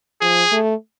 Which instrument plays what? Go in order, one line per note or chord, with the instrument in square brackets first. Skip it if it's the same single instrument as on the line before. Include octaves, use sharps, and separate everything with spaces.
[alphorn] F3 [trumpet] G#4
[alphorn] A3